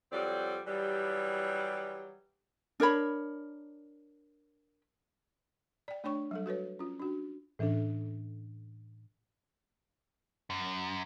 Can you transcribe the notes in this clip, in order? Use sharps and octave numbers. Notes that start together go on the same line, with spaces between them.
F2 F#3 G3 C4 D5
E3 F#3 G3
D4 A#4 C#5 B5
D5 G5
A3 D4 C#5 G5 C#6
F#3 G3 A4
F#4 A4 B4 C#5
C#4 F4
D4 F#4
A2 E3 C#4 D4 A4
F#2